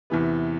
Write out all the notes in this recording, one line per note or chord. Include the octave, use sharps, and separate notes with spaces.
E2 C3 E3 B3